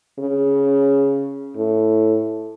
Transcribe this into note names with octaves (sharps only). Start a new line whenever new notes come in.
C#3
A2